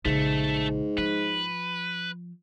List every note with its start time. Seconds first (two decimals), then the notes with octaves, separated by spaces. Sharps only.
0.05 A#1 G#2 C#3 A3
0.98 F3 B4